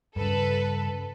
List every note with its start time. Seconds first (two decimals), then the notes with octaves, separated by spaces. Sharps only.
0.16 G2 C#3 A4 B4